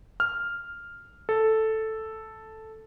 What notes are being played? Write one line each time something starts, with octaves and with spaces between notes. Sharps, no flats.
F6
A4